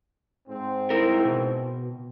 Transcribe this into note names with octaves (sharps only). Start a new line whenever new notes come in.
G#2 C4
E4 A#4
B2